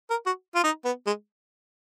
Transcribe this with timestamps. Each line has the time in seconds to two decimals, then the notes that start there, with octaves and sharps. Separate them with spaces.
0.10 A#4
0.26 F#4
0.55 F4
0.64 D#4
0.85 B3
1.07 G#3